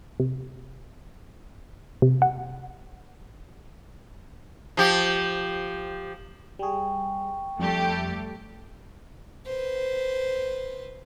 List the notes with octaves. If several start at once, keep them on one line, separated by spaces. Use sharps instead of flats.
C3
C3
F#5
F3 G4
G3 G#4 G5 C#6
F2 G3 A3 G4
B4 C5